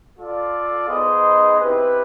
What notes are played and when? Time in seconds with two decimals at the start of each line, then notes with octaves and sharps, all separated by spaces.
0.17 F4 A4 D5
0.88 B3 D#4 G#4 C5 D#5
1.60 C4 E4 G4 B4